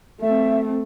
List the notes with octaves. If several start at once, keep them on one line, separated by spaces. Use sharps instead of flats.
A3 C4 E5